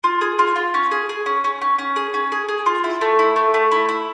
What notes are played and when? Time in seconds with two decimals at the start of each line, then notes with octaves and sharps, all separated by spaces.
0.04 F4
0.21 G#4
0.39 F4
0.56 F4
0.74 C#4
0.91 G#4
1.09 G#4
1.26 C#4
1.44 C#4
1.62 C#4
1.79 C#4
1.96 G#4
2.14 C#4
2.32 G#4
2.48 G#4
2.66 F4
2.84 E4
3.01 A3
3.19 E4
3.36 A3
3.54 A3
3.71 E4
3.89 E4